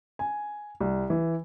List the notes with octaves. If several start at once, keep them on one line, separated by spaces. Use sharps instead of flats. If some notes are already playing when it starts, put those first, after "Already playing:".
G#5
C2
E3